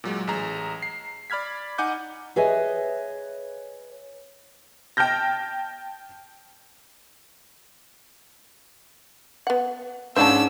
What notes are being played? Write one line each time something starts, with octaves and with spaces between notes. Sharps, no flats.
A#2 F#3 G#3
A1 G#4 A#5
C7
D5 B5 F6 G#6 B6
D#4 F#5 G#5 D6 G6
G#4 B4 C#5 D#5 E5 G#5
G5 A5 F6 G6 A#6
B3 F#5
G#2 C#4 D4 C5 F5 A5 E6